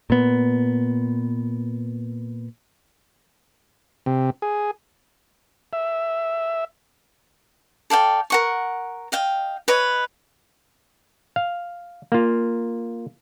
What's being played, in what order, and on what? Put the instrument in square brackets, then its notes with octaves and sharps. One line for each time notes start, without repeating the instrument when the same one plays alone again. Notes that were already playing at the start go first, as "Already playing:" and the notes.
[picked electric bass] A#2 B3
[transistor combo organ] C3
G#4
E5
[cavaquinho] A4 D5 F5 G5
A#4 F#5 C#6
D#5 F5 G5
B4 C#5 D#5
[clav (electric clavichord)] F5
A#3 F4